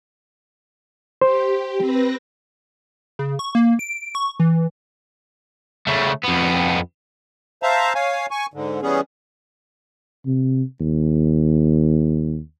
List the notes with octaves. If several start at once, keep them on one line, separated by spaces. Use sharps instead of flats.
G4 C5
C4 B4 A#6
C#3
C#6
A#3
D7
C#6
E3
C#3 A3
F2 B3
C5 E5 F5 A5 A#5
C#5 F5 G#5
G#5 C#6
G#2 D3
E3 G3 B3 C#4 G#4
C3
D#2